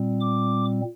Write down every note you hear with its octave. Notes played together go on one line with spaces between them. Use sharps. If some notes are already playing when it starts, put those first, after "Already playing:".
Already playing: A#2 G3 C4
D6